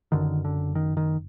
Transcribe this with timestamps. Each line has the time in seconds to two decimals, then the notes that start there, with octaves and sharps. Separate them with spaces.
0.12 F#1 F#2 D3 D#3
0.45 D3
0.75 D#3
0.97 D#3